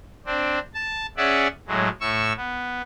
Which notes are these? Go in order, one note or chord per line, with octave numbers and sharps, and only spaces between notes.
C4 D4
A5
C#4 G#4 D5 E5 F#5
A2 F#3 G#3
A2 C#6 E6
B3